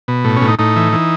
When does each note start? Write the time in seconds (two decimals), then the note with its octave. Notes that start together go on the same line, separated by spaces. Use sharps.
0.08 B2
0.25 A2
0.36 C#4
0.41 A2
0.48 D#4
0.59 A2 D#4
0.76 E3
0.93 E3